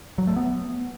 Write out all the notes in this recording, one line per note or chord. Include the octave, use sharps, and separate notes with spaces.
F#3
A3
B3